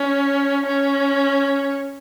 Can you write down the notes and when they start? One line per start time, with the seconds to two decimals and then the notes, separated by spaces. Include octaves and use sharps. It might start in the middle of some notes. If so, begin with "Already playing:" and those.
Already playing: C#4
0.66 C#4